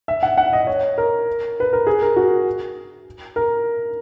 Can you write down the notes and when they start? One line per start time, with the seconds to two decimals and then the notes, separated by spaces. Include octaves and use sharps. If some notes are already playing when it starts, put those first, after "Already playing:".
0.08 E5
0.23 F#5
0.38 F#5
0.53 D#5
0.67 C#5
0.98 A#4
1.60 B4
1.73 A#4
1.87 G#4
2.02 A#4
2.16 F#4
3.36 A#4